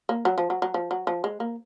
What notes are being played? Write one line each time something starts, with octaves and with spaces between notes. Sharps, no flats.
A#3
F#3
F3
F#3
F#3
F3
F#3
F3
G#3
A#3